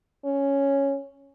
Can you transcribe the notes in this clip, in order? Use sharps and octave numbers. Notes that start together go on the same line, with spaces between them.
C#4